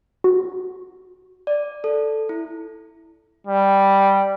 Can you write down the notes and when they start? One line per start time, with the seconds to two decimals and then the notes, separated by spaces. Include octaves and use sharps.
0.24 F#4
1.47 D5
1.84 A4
2.29 E4
3.47 G3